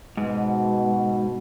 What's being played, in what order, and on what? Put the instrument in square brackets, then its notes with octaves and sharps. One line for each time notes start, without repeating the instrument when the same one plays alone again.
[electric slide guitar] G#2 [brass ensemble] B2